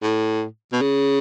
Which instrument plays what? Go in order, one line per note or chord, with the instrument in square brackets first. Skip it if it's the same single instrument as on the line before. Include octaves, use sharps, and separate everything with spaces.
[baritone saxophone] A2
B2
C#3